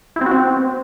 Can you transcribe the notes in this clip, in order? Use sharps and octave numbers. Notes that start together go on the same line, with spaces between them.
E4
C4
F#4
C4